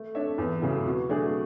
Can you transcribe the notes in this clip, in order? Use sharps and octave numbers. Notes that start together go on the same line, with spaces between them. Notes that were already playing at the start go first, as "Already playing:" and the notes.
Already playing: A3
D4 A4 C#5 E5
E2
C#3 F#3 A3 E4
B2
F#3 A3 D4 G#4